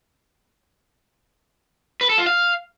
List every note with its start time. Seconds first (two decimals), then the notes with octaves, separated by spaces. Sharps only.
2.01 B4
2.09 A4
2.18 F4
2.27 F5